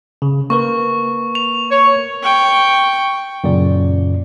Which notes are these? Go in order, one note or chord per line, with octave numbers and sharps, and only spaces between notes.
C#3
A#3 A#4 B4 C#6
F7
C#5
G5 C#6
F#2 A#2 C#3 D5